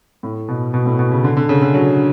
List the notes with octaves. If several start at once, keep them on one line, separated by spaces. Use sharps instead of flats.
A2
B2
B2
A2
B2
C#3
D3
D3
C#3
D3
F#3